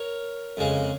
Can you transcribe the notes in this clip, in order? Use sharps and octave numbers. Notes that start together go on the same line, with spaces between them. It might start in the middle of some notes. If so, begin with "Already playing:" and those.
Already playing: A#4 C#5
F2 C#3 G#3